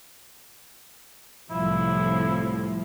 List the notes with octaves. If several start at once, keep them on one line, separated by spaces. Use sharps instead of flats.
C2 A2 F3 E4